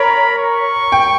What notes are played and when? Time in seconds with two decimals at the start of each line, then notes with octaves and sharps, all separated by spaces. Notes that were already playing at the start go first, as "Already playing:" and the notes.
Already playing: A#4 C#5 B5
0.39 C#6
0.92 G5